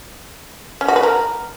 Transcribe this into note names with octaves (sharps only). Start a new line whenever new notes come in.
C#4
F#4
B4
A#4